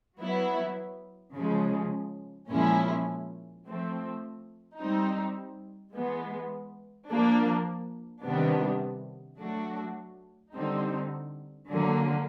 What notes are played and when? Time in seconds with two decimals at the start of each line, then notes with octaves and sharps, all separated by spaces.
0.19 F#3 B3 E4
1.34 C#3 F3 G#3
2.49 A#2 F3 G#3 C#4 E4
3.65 F3 A3 C4
4.78 G3 C4 D#4
5.94 E3 G#3 B3
7.09 F3 A#3 D4
8.24 C3 D#3 G3 B3 D4
9.39 F#3 A3 D4 F#4
10.54 D3 G3 C4 D#4
11.69 D3 F#3 A#3